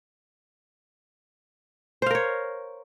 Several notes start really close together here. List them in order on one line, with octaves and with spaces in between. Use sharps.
C5 F5 A#4 C#5